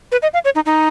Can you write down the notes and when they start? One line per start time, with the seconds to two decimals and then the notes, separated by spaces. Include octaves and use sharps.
0.12 B4
0.22 D#5
0.33 F5
0.44 C#5
0.55 D#4
0.66 D#4